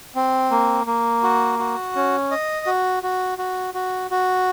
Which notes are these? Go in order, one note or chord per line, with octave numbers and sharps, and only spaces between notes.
C4
A#3
A#3
F#4
F#4
C#4
D#5
F#4
F#4
F#4
F#4
F#4